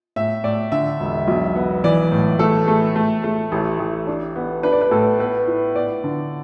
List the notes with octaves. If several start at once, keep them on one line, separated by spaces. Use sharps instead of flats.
A2 E5
A2 D5
D3 E5
E1
B1
B3
E3 D5
A2
A3 A4
A3
A3
A3
A1
A1
D4
B3
D4 B4
D5
B4
A2 A4
B3 B4
E4
B3 D5
D3